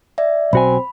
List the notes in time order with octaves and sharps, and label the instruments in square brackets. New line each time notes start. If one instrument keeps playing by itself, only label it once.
[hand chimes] D5 E5
[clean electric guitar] B1 F#4 G#5 [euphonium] C4 [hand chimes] B5